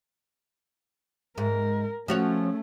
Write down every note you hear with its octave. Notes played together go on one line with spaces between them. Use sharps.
G#2 A#4
F3 A3 C#4 F#4 C#5